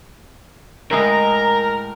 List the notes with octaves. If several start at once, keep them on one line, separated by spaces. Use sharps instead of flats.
A2 G#3 A#4 D#5 A#5